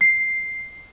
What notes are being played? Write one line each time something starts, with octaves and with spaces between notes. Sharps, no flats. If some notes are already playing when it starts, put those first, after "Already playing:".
C7